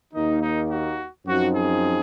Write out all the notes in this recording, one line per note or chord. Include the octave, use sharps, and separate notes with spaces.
D#2 D#3 A#3 D#4
D#4
F#4
F#2 F3 C4 D#4 F#4
G#4